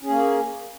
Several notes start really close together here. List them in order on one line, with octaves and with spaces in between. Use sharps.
C#4 G#4 A#3